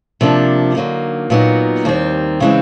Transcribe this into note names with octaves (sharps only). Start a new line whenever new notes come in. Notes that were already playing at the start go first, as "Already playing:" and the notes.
C3 F3 A#3 D4
D3 F#3 A#3 D#4
A#2 F#3 B3 D#4
D#2 D#3 G3 C4
C#3 E3 G#3 C4